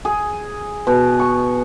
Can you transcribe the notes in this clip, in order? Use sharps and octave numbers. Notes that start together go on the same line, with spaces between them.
G#4
B2
C#6